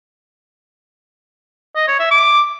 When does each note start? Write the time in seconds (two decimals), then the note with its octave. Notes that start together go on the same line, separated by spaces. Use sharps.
1.76 D#5
1.88 C#5
1.99 E5
2.11 D6